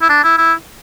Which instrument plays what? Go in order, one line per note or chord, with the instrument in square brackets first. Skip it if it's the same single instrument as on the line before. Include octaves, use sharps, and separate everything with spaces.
[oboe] E4
D4
E4
E4